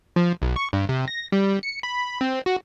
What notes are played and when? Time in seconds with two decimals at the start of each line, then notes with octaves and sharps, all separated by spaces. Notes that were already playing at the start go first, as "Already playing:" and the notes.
0.16 F3
0.42 B1
0.56 C#6
0.73 G2
0.89 C3
1.08 A#6
1.32 G3
1.63 C#7
1.83 B5
2.21 C4
2.46 F#4